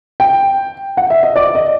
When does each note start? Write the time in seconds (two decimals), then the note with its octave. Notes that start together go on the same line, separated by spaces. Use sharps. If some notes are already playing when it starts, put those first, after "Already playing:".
0.20 G5
0.97 F#5
1.10 E5
1.23 D#5
1.36 D5
1.55 D#5